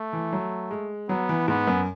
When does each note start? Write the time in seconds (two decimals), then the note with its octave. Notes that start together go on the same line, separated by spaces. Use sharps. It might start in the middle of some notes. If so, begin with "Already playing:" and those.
Already playing: A3
0.13 E3
0.32 F#3
0.71 G#3
1.09 F#3 B3
1.29 E3
1.48 G#2 B3
1.67 F#2